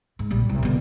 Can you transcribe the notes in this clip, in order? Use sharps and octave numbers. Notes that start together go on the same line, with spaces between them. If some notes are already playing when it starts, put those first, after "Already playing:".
G#2
A#1 G3
C2
B2 D3